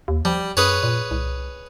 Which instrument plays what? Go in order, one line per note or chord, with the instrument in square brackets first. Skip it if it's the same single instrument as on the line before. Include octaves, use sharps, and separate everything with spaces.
[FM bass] D#2
[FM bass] F3 [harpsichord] G3
[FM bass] F#2 [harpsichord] G#4 B4 C#5
[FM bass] A#2
C2